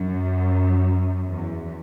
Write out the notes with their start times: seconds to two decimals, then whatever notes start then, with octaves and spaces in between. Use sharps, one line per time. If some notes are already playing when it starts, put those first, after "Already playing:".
Already playing: F#2
1.28 E2